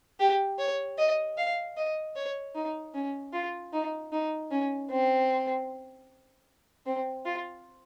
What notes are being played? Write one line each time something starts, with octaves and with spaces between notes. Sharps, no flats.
G4
C#5
D#5
F5
D#5
C#5
D#4
C#4
F4
D#4
D#4
C#4
C4
C4
F4